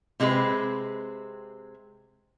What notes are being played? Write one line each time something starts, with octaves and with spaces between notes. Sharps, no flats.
C3 G#3 C4 D#4 B4